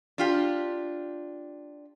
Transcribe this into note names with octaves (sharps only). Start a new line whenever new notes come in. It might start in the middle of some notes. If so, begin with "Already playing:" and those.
D4 F4 G4